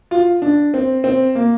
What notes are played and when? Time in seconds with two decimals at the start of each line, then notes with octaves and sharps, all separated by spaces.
0.11 F4
0.42 D4
0.74 C4
1.04 C4
1.35 A#3